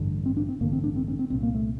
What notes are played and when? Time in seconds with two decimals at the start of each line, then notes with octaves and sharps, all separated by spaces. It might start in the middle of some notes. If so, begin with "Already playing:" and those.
Already playing: A1 G2 D3
0.26 C4
0.37 D4
0.49 C4
0.61 A1 G2 D3 A#3
0.73 C4
0.84 D4
0.96 C4
1.08 C4
1.19 C4
1.30 C2 A#2 C4
1.43 A#3
1.55 A3